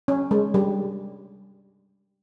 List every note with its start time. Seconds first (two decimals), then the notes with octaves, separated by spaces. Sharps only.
0.08 C#4
0.31 G#3
0.54 G3